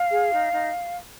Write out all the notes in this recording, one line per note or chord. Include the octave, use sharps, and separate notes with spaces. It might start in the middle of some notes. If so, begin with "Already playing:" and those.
Already playing: F5
G#4
D#4
D#4